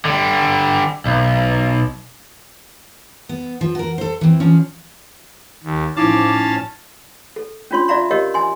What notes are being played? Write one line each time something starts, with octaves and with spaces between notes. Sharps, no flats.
D3 G3
B1
B3
F3
F#4 A#4
A4 C5
E3 C4
F3 C#4 D4
D#2
A2 F3 C#4 D#4 E4 F5 A5 D6
A4
C#4 D4 F4 C#5 C6
F4 D5 E5 F5 A#5 C6
G4 A#4 C#5 D#5 F5
G#5 C6